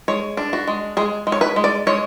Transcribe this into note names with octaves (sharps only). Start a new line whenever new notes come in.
G#3 C#5
D4
F#4
G#3
G#3 G#4
G#3
C#5
B4
G#3
D5
G#3 C#5